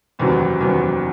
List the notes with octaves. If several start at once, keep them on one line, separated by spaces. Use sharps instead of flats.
F#1 E2 C3 D#3 F#3
F#1 E2 C3 D#3 F#3